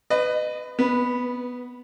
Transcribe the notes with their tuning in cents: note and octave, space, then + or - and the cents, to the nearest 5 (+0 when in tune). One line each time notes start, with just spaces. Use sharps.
B4 +20 D#5 -25
B3 +0 B4 -20